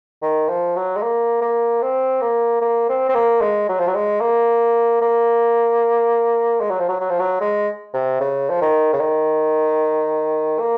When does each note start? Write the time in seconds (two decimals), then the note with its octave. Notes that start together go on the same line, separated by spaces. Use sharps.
0.22 D#3
0.49 F3
0.76 F#3
0.96 G#3
1.02 A#3
1.41 A#3
1.82 C4
2.21 A#3
2.61 A#3
2.89 C4
3.09 C4
3.14 A#3
3.41 G#3
3.69 F#3
3.79 F3
3.87 F#3
3.95 G#3
4.21 A#3
5.01 A#3
6.60 G#3
6.70 F#3
6.78 F3
6.89 F#3
7.00 F#3
7.10 F3
7.19 F#3
7.41 G#3
7.94 C3
8.20 C#3
8.50 F3
8.61 D#3
8.93 C#3
9.00 D#3
10.59 A#3